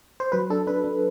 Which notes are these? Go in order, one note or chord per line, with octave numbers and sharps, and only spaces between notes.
C5
F#3 B4
D4 A4
D4 B4
D4